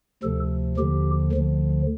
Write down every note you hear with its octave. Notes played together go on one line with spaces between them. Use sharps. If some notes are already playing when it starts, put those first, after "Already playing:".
D2 C3 F3 A4
D#2 D3 F3 G4
D2 D3 F3